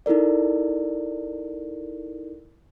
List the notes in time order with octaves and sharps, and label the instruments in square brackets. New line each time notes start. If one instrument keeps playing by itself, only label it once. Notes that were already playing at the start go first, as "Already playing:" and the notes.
[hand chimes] D#4 E4 A4 A#4 D5